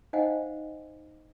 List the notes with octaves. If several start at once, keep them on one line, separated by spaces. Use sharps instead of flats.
D#4 C5 D#5 F5 F#5 G#5